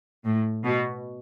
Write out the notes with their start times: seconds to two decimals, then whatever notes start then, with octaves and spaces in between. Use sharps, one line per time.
0.25 A2
0.63 B2